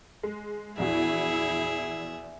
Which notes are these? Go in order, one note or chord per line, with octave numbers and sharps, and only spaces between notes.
G#3
A#1 E2 E4 F#4 G#4 E5